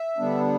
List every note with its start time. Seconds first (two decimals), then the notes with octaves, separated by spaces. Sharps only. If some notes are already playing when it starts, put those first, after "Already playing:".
Already playing: E5
0.18 D3 G3 B3 D4